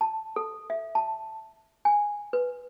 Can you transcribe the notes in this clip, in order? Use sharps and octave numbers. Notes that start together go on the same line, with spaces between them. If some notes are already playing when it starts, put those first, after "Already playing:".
A5
A4
E5
A5
G#5
B4